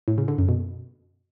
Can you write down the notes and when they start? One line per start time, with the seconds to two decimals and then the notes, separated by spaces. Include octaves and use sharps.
0.08 A2
0.18 C#3
0.28 D3
0.38 F#2
0.49 B2